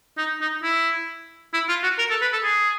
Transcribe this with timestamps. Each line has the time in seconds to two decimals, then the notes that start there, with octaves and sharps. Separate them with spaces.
0.18 D#4
0.41 D#4
0.63 E4
1.54 E4
1.69 F4
1.83 F#4
1.99 A#4
2.10 A4
2.22 B4
2.33 A4
2.44 G#4